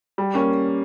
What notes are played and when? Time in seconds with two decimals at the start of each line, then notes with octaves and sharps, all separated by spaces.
0.18 G3
0.34 A#3 C#4